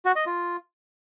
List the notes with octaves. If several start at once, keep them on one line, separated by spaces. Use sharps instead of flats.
F#4
D#5
F4